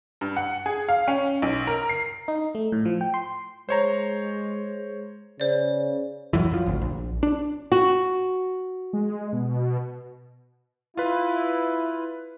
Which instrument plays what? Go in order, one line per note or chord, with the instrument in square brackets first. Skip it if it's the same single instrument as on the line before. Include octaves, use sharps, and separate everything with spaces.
[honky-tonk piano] G2
F#5
G#4
F5
C#4
B1
A#4
C7
[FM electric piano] D#4
A3
A2
F3
G5
C6
[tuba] G#3 [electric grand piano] C5 C#5 A#5
[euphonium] C#3 [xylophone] C5 D5
[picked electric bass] D#1 G#1 F#2 E3
F#2 F3
G#1 D2
A#1
D4
[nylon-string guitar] F#4
[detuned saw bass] G#3
B2
[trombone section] E4 [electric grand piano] F4 B4